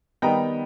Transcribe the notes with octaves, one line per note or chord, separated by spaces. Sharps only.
D#3 G3 B3 D#4 G5 A#5